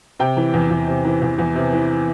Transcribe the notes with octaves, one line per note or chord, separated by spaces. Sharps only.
C3 G5
E3
E2
E2
C3
E3
E2
E2
C3
E3